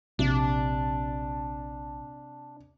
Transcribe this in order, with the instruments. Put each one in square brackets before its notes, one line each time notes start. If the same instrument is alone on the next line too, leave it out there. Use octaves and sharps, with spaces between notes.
[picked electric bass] A#1 [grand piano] C3 [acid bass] D4